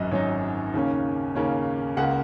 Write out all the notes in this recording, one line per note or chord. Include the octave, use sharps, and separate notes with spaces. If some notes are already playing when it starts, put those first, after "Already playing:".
Already playing: G#1 F#2 F#3 D#4 D#5
G#1 F#2 F#3 D#4 C#5
D#2 C#3 A#3 C#4
D#2 C#3 A#3 C#4
C#2 C#3 A#3 F#5